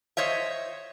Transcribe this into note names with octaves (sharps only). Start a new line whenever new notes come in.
C5 C#5 D#5 E5